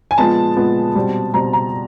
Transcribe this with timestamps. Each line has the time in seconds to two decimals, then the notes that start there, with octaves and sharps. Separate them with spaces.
0.11 G#5
0.18 A#2 F3 G#3 B3 A5
0.57 A#2 F3 G#3 B3
0.95 B2 G3 C4
1.34 B2 G3 C4 A#5
1.53 A#5